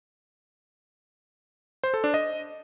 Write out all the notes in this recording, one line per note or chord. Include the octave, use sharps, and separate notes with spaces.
C5
A4
D4
D#5